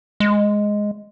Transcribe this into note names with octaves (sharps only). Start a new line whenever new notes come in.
G#3